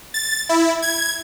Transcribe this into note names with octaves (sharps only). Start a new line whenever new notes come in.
A6
E4
G#6